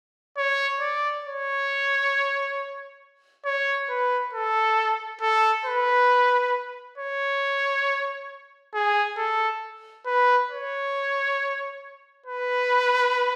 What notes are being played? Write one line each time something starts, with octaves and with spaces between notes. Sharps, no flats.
C#5
D5
C#5
C#5
B4
A4
A4
B4
C#5
G#4
A4
B4
C#5
B4